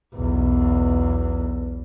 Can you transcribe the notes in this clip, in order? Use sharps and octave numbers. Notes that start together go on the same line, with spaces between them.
B1 E2